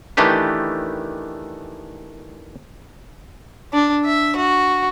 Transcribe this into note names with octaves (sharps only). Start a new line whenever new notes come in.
D#3 E3 A3 D4 G4 B4
D4
E5
F#4